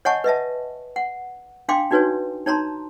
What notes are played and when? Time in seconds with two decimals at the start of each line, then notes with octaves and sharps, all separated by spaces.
0.05 C#5 D#5 F#5 G#5 A5 C#6
0.24 B4 D#5 E5 A5
0.96 F#5
1.69 D4 F5 G5 C6 D6
1.91 D4 D#4 F#4 B4 C#5 G#5
2.46 D#4 C#5 A5 A#5 C6